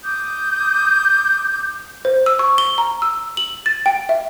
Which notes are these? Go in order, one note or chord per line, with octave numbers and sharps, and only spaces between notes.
D6 D#6 G6
C5
E6
C#6
G7
A#5
E6
F#7
A6
G5
E5